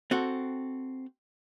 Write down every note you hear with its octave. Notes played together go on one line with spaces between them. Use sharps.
C4 F#4 A4